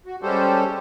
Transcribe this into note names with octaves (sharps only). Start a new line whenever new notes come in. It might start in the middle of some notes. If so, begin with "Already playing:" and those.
F#4
G3 G#3 C#4 G4 A4 C5